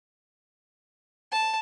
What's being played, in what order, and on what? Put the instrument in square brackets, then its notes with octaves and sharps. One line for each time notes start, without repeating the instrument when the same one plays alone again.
[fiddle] A5